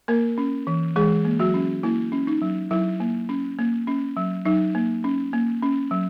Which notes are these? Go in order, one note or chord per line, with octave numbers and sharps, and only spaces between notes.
A#3 A#4
C#4
E3
E3 G#3 G#4
A#3
F#3 F#4
C#4
A#3 E4
C#4
D#4
F#3
F#3 E4
A#3
C#4
A#3
C#4
F#3
F#3 D#4
A#3
C#4
A#3
C#4
F#3